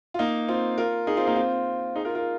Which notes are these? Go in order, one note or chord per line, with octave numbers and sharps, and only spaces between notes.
F4
A#3 D#4
C4 F4
F4 A#4
D#4 G#4
C4 F4
A#3 D#4
C4 F4
D#4 G#4
F4 A#4
F4 A#4